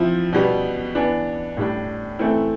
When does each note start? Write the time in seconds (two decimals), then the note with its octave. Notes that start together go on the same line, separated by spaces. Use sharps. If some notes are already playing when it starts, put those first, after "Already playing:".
Already playing: F3 C4 E4
0.33 B2 G3 B3
0.95 E3 B3 D4
1.57 A2 G3 D4
2.19 E3 A3 C4 E4